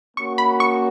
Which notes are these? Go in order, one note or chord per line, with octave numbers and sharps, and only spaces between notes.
A#3 C#4 F#4 C#6
B5
C#6